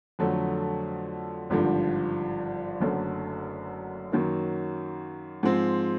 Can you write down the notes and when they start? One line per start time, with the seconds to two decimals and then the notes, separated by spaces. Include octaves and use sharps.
0.19 F2 D3 F#3 A3
1.50 G#1 G2 D3 F3
2.80 F#1 F#2 D3 F#3 A3
4.12 F#2 D#3 F#3 A#3
5.43 G#2 F3 G#3 C4